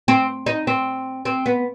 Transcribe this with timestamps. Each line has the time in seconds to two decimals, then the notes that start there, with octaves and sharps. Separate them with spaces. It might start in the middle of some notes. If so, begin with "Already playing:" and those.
0.08 C4
0.46 D#4
0.67 C4
1.25 C4
1.46 B3